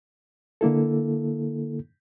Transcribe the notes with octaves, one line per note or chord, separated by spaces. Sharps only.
D3 A#3 E4 A4